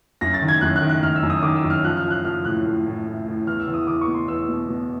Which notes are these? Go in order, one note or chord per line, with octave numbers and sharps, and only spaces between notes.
F#2 A#6
A6
D#3
G#6
F#2 F#6
F#6
D#3
F#6
F#2 F6
E6
F#2
D#6
D#3 D6
E6
F#2
F6
F3 F#6
F6
F3
F#6
F3 F6
A2 F#6
A2
A2
A2
A2
E2 F6
E6
E2
D#6
E2 D6
C#6
B2
C6
E2 E6
B2
B2